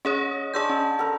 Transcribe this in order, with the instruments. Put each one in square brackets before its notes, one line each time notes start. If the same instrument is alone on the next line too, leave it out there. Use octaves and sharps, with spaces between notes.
[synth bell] C#4 G#4 C#5 [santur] D#5
[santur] G#3 D4 [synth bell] G#4 E6 G6
[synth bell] C#4
[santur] A4 A#4